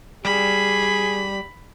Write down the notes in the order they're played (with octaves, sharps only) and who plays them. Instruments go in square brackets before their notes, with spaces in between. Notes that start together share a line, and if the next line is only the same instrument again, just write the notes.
[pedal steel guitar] G3 [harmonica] G#4 [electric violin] B5